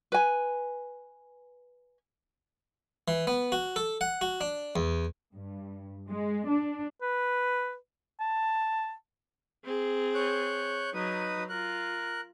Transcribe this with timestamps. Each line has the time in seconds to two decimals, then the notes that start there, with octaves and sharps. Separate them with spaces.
0.12 B4 G#5
3.08 E3
3.27 B3
3.52 F#4
3.76 A4
4.01 F#5
4.21 F#4
4.41 D4
4.76 E2
5.34 G2
6.10 G#3
6.49 D4
7.02 B4
8.20 A5
9.65 C4 G#4
10.14 C#5 F#6 G6
10.94 F#3 D#4 B4 D#6
11.49 F4 A#4 F#6